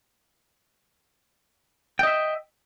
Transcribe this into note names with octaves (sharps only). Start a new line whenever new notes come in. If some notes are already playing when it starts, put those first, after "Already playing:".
D#5 E5 G5